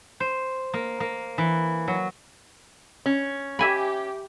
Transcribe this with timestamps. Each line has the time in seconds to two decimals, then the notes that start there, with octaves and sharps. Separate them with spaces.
0.20 C5
0.74 A#3
1.00 A#3
1.38 E3
1.88 F#3
3.06 C#4
3.59 G4 E5 G#5 B5